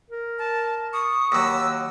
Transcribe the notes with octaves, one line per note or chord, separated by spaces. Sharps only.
A#4
A5
C#6 D#6
D#2 F#3 E6